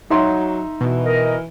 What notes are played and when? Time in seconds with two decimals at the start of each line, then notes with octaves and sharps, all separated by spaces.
0.10 F#3 D#4 E5 C6
0.81 B2 E3
1.06 A#4 D#5